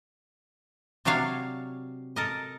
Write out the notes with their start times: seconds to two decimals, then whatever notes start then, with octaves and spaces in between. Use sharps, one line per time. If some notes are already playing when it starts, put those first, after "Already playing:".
1.05 C3 F#3 D4 C#5 F5
2.16 A4 A#4 D#5